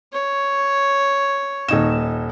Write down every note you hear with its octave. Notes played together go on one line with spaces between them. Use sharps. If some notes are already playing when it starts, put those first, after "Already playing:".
C#5
D#1 D#4 E7